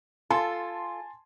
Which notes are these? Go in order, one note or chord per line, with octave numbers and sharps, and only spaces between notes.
F4 A4 G#5 A5 C6